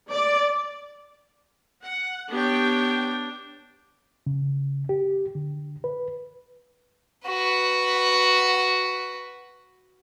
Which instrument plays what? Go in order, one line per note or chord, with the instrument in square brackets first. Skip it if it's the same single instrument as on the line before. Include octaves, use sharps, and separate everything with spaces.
[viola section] D5
F#5
[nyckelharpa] B3 C#5 [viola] D4 [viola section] G4 G5
[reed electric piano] C#3
G4
D3
B4
[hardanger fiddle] F#4 B4